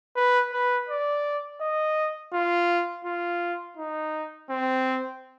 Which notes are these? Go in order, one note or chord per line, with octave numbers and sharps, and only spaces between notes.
B4
B4
D5
D#5
F4
F4
D#4
C4